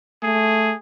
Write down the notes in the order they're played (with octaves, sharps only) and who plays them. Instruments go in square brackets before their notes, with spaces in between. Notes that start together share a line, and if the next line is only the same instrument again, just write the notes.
[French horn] A3 [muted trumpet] G#4